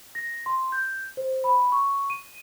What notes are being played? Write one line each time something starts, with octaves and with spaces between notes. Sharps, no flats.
A#6
C6
G6
C5
B5
C#6
D#7